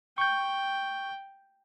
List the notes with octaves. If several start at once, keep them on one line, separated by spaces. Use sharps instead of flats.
G5 C#6 G6